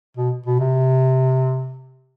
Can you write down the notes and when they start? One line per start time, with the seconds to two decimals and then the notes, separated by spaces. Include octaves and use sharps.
0.17 B2
0.46 B2
0.59 C3